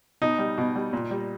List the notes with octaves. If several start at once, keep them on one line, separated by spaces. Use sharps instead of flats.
B2 D#4
G3
B2
G3
A#2
G3